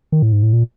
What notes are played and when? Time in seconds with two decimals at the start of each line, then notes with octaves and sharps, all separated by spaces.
0.12 D#3
0.22 A2
0.32 G#2
0.43 A2
0.53 A#2